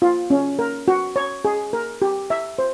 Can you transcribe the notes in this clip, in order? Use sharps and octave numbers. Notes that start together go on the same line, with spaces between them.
F4
C#4
A#4
F#4
C#5
G#4
A#4
G4
E5
C5